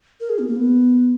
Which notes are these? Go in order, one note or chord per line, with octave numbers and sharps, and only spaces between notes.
A#4
G#4
B3
A#3
B3